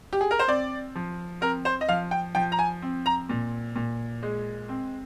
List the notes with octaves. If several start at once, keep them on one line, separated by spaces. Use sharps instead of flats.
G4
G#4
A#4
C5
C4 D5
F3
C4 A#4
C5
D#5
F3 F5
G5
F3 G5
A#5
G#5
C4
A#5
A#2
A#2
G#3
C4